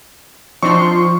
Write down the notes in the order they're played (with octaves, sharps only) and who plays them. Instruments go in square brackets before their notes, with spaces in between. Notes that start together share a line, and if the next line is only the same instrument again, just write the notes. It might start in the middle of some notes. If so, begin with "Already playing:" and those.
[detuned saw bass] F3 [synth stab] C4 D4 D#4 [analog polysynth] C6 [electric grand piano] C#6